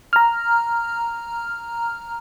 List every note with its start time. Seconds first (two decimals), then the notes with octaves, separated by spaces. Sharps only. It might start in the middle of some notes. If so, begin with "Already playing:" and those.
0.13 A#5 F6